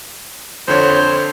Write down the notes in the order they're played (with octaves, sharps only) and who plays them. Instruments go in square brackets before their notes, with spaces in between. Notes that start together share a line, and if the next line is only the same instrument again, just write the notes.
[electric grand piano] F2 D3 C#5 [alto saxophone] C5